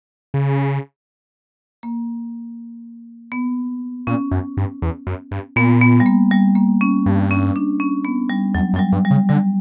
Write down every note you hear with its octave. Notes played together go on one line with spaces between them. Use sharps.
C#3
A#3
B3
A#2 C#4
F#2
G2
E2
F#2
G2
A#2 B3
B3
G3
A#3
G3
A#3
C#4
G2
C#4
D4
C#4
B3
G3
E2 F#3
F#2
F#3
G3
G2
G3
C#3
D3 G3